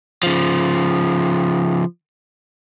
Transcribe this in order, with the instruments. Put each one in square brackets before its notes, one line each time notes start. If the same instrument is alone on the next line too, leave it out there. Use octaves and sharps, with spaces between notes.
[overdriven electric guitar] C#3 F3